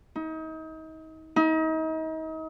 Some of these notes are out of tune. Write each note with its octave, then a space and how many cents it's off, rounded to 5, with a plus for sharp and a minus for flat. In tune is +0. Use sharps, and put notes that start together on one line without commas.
D#4 +35
D#4 +35